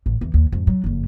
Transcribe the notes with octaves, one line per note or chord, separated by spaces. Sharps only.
A1
E2 E3
D#2
F2 G#2
F#3
F#1 F2